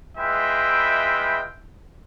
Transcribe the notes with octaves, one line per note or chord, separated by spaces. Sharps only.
G#3 E4 F4 B4 E5 G5